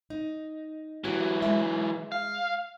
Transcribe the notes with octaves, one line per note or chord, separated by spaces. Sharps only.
D#4
E3 F#3 F#4 G4
G#3 E5
F5